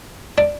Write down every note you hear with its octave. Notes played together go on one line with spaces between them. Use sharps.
D4